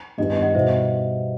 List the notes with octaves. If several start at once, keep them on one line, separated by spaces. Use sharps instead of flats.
G2 D#3 G3 B3 E4 D#5
D#5
D#5 F#5
B2 G3 D#4 F#4 C5 E5